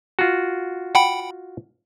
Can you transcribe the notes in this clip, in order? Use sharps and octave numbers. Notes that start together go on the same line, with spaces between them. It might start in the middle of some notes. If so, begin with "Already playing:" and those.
F4 F#4
F#5 G5 B5